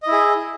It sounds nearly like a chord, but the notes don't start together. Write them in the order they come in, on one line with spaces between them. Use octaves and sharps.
D#5 E4 G#4